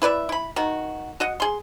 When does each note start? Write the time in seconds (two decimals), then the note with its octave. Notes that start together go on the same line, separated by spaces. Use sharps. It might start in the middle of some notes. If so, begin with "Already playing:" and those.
0.02 E4 B4 D5 E5
0.29 E4 B5
0.56 D#3 F#4
1.20 F#4 D#5 F#5
1.40 G#4 C6